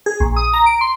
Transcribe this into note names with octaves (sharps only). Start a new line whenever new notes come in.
G#4
A#1
D#6
A#5
D7
C6